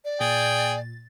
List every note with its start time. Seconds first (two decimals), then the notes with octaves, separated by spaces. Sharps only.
0.05 D5
0.20 A#2 G#4 G5 A6